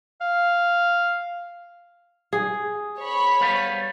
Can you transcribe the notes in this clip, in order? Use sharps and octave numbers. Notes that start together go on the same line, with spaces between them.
F5
G#4
C#5 B5
G3 B3 F5